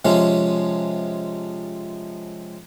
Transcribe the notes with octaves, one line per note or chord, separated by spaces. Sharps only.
C3 F3 G#3 C#4